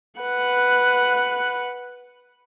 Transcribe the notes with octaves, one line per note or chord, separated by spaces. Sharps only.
B4 F#5